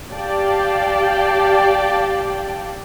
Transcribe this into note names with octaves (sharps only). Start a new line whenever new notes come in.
G4 D5 F5 G5 A5